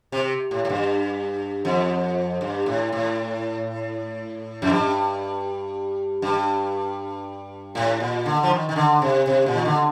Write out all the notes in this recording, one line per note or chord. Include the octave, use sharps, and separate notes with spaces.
C3
A2
A2
G2
F2
G2
A2
A2
F2
G2
G2
A2
A#2
D3
F3
D#3
D#3
D3
C3
C3
A#2
D#3
D3